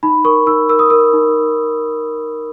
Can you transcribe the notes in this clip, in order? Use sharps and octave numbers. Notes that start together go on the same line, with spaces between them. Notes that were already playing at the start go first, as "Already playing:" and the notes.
D#4 B5
A#4 C#6
D#4 E6
A#4 E6
D#6
A#4 E6
D#4